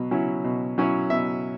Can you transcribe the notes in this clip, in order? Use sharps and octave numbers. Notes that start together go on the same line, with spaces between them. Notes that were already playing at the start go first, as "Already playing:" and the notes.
Already playing: B2 F#3
F#3 C#4 E4
B2
F#3 C#4 E4
B2 E5